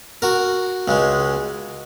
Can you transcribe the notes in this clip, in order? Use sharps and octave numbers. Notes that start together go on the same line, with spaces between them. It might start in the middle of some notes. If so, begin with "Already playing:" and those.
F#4 A#4
C#2 C#3 G#3